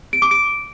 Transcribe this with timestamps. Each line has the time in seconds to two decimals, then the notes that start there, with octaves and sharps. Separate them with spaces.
0.13 D7
0.22 D6
0.31 D7